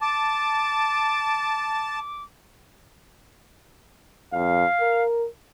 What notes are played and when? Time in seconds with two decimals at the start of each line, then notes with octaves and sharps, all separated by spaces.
0.01 A5 D6
4.33 F2 F5
4.81 A#4